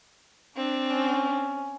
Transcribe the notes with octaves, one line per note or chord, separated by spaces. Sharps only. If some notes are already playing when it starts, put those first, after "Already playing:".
C4 D4
C#4